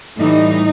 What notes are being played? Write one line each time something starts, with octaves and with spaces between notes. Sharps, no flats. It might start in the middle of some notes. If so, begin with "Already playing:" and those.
A2 E3 G3 D#4